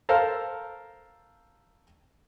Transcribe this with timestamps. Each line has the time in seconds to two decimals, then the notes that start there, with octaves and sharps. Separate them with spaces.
0.09 A4 A#4 C5 F5